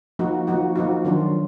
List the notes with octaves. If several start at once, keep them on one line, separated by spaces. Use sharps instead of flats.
F3 A#3 D#4 F#4
F3 A#3 D#4 F#4
F3 A#3 D#4 F#4
D#3 F#3 D4 F4